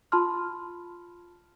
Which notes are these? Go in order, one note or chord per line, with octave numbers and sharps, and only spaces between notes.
F4 A5 B5 C6 F6